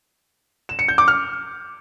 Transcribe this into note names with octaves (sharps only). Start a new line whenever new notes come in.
E7
C#7
G6
D6
F6